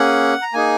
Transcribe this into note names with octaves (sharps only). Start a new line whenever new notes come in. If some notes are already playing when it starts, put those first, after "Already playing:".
Already playing: A#3 C#4 G#4 F#5
A#5
A#3 D#4 G#4 G#5